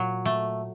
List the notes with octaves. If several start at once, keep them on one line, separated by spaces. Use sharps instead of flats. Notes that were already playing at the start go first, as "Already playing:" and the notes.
Already playing: A#2 F#3
A3